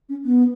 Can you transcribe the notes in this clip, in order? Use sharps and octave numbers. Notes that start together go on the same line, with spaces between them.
C#4
B3